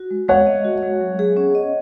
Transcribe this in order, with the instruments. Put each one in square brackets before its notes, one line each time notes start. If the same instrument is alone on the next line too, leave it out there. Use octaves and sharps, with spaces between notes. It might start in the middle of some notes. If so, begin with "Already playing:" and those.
Already playing: [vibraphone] F#4
G#3
[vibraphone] G#3 [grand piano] C#5 F#5
[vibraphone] D#5
F#4
G#3
F#3
G#4
C#4
D#5